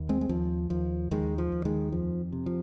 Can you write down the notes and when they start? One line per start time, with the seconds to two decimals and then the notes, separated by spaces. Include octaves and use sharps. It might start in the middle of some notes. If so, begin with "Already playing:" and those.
Already playing: D#2
0.09 G#3 C4
0.21 G#3
0.29 D#2 F3
0.70 D#2 F3
1.11 D#2 D#3 G#3
1.38 F3
1.52 D#2
1.65 D#3 G#3
1.92 F2 F3
2.32 C3
2.46 F3